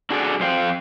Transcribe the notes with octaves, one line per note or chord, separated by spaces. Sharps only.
D4 F#4 G#4 A4 C#5 D5
F2 C5 F5 G5